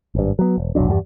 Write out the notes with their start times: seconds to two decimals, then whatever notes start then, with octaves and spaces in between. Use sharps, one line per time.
0.15 G#1 G2
0.39 F#3 B3
0.58 E1
0.75 F1 B1 F#3 D4
0.88 E2 G2 F#3 G3